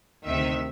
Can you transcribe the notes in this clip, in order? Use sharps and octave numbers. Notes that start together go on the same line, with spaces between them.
D2 C3 D#3 E5